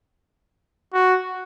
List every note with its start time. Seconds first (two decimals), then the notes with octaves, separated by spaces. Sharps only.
0.93 F#4